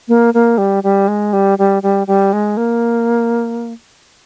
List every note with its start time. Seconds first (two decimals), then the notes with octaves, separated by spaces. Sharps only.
0.08 A#3
0.34 A#3
0.58 G3
0.83 G3
1.08 G#3
1.33 G3
1.59 G3
1.83 G3
2.07 G3
2.33 G#3
2.57 A#3